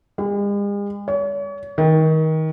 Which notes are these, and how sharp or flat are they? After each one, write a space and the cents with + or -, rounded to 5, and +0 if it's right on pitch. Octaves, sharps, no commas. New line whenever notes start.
G#3 -45
C#5 +40
D#3 +25